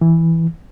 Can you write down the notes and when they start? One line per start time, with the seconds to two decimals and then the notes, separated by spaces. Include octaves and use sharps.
0.01 E3